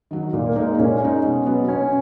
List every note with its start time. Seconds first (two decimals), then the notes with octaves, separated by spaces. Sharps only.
0.11 D#3 F#3
0.33 A#2 A#3
0.45 A#3
0.56 G#3 A#3 D#4
0.67 A#3
0.78 A#2 C#4
1.01 G#3 D#4
1.23 B2
1.46 F#3 B3
1.68 B2 C#4